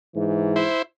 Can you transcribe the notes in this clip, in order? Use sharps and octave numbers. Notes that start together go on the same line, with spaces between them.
G#2 E3
E4 C5